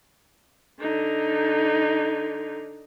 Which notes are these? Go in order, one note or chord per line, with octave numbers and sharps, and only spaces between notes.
D3 D#4